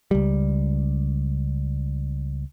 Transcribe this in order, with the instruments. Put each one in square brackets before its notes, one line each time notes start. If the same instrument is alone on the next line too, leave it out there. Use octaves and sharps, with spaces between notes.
[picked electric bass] C#2 G3